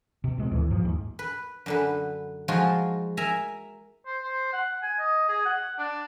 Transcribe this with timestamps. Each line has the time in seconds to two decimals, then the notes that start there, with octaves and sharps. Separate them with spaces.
0.24 B2
0.38 A#2 G#3 A#3 C4
0.51 D2 A2 E3
0.70 G2 A#2 F3 F#3
0.83 D#2 G#2
1.19 B4
1.66 F#2 D3 B4
2.48 F3 G#3 D#4 F4 F#4
3.17 A#4 E5 G#5 A#5
4.06 C5
4.23 C5
4.53 F#5
4.83 G#5
4.99 D#5
5.29 G#4
5.45 F#5
5.78 D4